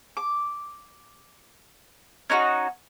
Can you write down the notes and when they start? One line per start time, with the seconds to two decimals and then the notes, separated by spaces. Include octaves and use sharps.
0.17 D6
2.30 C#4 D#4 E4 F#4